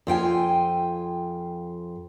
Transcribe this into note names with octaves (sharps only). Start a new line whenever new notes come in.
F2 F4 G5 G#5